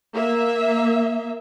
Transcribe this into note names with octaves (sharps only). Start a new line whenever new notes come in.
A#3 E5